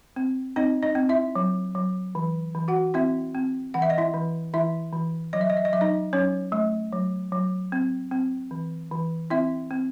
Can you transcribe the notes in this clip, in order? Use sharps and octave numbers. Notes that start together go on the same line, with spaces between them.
C4
C4 D#4 D#5
D#4 D#5
C4
E4 E5
F#3
F#3
E3
E3
F#4 F#5
C4 E4 E5
C4
E3 F#5
E5
D#5
E4 E5
E3
E3 E4 E5
E3
F#3 D#5
E5
D#5
E5
D#5
F#3 E5
D#4 D#5
F#3 C#4 C#5
A3
F#3
F#3
C4
C4
E3
E3
C4 E4 E5
C4